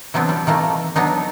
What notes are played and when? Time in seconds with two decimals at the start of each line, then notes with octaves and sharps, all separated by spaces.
0.14 E3 F#3 B3 C4 D4
0.29 G3
0.47 D#3 E3 A3 A#3
0.96 F#3 B3 D4 D#4